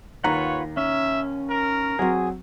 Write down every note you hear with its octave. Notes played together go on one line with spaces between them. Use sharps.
D#2 F4 B4 C#5 F#5 A#5
C#4 E5
A#4
F#3 C4 F#4 G#4